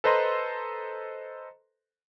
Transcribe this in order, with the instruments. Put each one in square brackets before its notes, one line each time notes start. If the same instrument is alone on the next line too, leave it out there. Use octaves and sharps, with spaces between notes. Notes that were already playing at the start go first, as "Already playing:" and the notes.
[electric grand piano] A4 B4 C5 D#5 A#5 C6